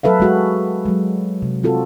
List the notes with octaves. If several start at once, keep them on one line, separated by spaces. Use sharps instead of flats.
F#3 A4 B4 E5 F5
G#3 F#4 G#4
F#3 G#3
C3
C4 F4 F#4 A4